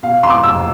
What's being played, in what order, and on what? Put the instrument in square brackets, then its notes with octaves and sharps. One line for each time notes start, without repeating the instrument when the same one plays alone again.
[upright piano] B2 F5
E2 C6
D6
F1 E6